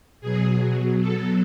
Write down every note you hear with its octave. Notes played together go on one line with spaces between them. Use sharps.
B2 F#3 G#4
A4